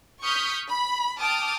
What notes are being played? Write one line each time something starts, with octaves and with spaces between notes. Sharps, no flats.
C#6 D#6 F6 G6 B6
B5
G5 A5 D6 D#6 F6